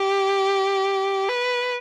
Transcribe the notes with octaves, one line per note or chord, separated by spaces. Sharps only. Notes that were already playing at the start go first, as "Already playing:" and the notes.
Already playing: G4
B4